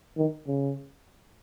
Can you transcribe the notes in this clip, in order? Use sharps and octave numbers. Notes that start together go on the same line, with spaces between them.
D#3
C#3